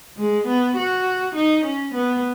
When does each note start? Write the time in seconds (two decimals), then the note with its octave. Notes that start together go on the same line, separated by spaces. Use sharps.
0.17 G#3
0.47 B3
0.76 F#4
1.36 D#4
1.65 C#4
1.95 B3